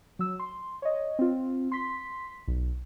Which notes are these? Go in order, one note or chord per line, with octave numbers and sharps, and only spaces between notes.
F#3 E6
C6
C#5 D#5
C4 F4
C6 B6
B1